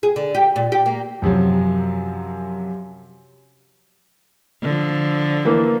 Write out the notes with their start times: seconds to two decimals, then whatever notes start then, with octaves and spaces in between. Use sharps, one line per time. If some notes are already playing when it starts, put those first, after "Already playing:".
0.03 G#4
0.16 D3
0.35 G4
0.56 A#2
0.72 G4
0.86 A#3
1.22 F#2 C3 F3 F#3
4.62 D3 F3
5.45 E3 A#3